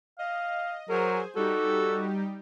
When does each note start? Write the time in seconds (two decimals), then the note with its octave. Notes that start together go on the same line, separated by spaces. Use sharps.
0.19 D#5 F5
0.89 F#3 G#4 A#4 C5 G#5
1.36 G3 D#4 F#4 G4 A4